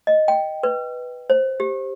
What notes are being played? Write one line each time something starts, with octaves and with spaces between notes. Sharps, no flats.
D#5
G5
B4
C5
G4